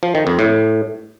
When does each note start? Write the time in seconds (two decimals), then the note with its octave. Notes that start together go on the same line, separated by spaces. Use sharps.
0.03 F3
0.15 D#3
0.27 F2
0.39 A2